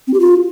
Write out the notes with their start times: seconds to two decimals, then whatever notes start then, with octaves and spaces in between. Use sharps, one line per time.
0.07 C4
0.14 G4
0.20 F4